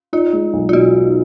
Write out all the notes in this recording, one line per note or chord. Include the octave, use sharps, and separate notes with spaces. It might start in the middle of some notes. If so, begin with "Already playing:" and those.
D#4 F4
G#3
B1
F4
B2 F#4
D#4